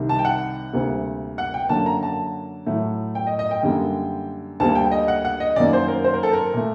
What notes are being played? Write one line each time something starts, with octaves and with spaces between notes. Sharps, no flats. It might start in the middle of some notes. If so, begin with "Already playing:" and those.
Already playing: C2 C3 D#3
A5
G5
F#5
D2 C3 G3 A#3
F#5
G5
F#2 D3 F#3 A#3 A5
A#5
A5
A2 F#3 A3
G5
D#5
D#5
G5
F#2 D3 G3 A#3
D2 D3 G3 A#3 A5
G5
D#5
F#5
F#5
D#5
F#2 D#3 F#3 A#3 D5
C5
A#4
C5
A#4
A4
A#4
A#2 A3